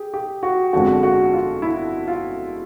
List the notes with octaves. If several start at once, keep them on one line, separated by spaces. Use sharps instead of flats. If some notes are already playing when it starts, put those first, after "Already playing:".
Already playing: G4 G#4
G4
F#4
G1 F2 D3 F3 G#3 F#4
F#4
F4
E4
F4